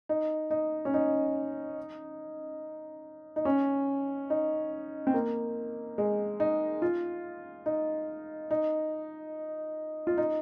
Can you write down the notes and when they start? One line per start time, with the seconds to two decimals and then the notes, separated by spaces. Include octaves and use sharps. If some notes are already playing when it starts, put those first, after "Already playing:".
0.09 D#4
0.51 D#4
0.85 C#4
0.94 D#4
3.36 D#4
3.45 C#4
4.30 D#4
5.07 C4
5.14 A#3
5.98 G#3
6.40 D#4
6.82 F4
7.66 D#4
8.51 D#4
10.07 F4
10.18 D#4